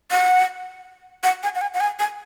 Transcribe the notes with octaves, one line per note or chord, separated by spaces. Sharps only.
F#5
F#5
G#5
F#5
G#5
F#5
G#5
G#5